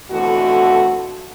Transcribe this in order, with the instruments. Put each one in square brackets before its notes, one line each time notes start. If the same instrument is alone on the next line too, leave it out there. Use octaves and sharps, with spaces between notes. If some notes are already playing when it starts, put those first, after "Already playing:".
[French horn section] F2 B2 D3 E3 A3 F#4